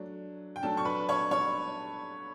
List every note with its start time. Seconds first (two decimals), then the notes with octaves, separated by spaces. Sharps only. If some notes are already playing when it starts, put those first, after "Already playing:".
Already playing: F#3 A3 D4
0.56 G5
0.63 F#3 A3 D4 A4 A5
0.77 C#6
0.85 B4 B5
1.09 C#5 C#6
1.31 C#5 C#6